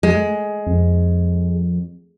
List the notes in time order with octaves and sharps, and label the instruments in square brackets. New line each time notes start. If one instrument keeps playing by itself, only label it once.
[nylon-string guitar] G#3
[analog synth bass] F2